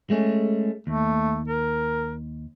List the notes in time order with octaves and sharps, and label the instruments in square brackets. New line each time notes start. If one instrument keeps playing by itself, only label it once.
[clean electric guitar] G#3 A3 C#4
[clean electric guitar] D#2 [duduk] A3
[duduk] A#4